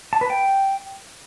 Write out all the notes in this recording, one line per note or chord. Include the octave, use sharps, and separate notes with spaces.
A5
B4
G5